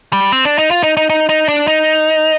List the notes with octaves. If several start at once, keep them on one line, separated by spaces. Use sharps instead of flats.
G3
C4
D4
D#4
F4
D#4
D#4
D#4
D#4
D4
D#4